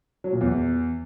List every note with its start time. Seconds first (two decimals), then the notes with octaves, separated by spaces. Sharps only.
0.24 F#3
0.33 A#2
0.41 E2